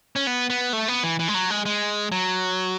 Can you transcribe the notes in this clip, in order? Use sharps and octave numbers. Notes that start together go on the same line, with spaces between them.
C#4
B3
B3
A3
B3
E3
E3
G#3
F#3
G#3
G#3
F#3